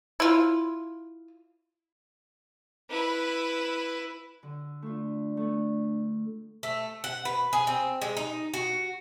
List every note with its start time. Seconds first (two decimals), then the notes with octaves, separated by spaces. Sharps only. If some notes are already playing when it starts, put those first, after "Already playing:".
0.20 E4 F4
2.90 E4 B4
4.43 D3
4.82 A3 D4 F4
5.37 A3 B3
6.63 A3
7.04 F#5
7.25 B4
7.53 G#4
7.67 C4
8.02 G#3
8.17 D#4
8.54 F#4